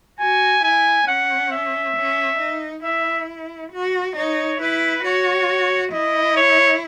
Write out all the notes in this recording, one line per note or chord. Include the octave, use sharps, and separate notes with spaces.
F#4 G#5
E4 G#5
C#4 F#5
E5
C#4
D#4
E4 E5
F#4
D#4 C#5
E4 B4
F#4 C#5
E4 D#5
C#5